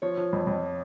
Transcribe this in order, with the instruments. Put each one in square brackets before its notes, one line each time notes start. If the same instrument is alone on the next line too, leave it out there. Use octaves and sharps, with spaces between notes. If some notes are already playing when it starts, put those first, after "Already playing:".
[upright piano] F3 [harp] C#5
[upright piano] F3
F2
F2